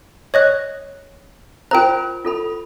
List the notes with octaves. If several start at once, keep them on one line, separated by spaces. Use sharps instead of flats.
C#5 D#5 F#6
F4 A#4 C5 G5 A#5
F4 A4 B5